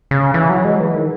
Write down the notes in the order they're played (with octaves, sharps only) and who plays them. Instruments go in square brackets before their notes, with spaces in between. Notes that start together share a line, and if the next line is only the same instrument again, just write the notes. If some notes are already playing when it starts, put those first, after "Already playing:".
[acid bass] C#3
E3
F#3
G#3
E3
D#3